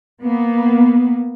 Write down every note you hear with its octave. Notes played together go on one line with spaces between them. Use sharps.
A#3 B3